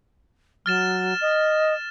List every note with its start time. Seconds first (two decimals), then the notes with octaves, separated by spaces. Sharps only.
0.66 F#3 F6 A6 E7
1.21 D#5